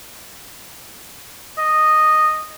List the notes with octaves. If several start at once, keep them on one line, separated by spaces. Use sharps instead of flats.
D#5